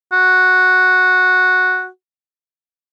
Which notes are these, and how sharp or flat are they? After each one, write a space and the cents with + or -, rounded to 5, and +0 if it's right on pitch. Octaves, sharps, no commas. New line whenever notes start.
F#4 -5